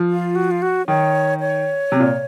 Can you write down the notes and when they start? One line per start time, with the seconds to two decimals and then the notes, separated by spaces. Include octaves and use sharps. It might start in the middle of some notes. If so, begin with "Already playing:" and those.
Already playing: F3
0.09 F4
0.35 F#4
0.51 F4
0.62 F#4
0.87 D#3 C#5
1.40 C#5
1.92 C3
2.00 A#2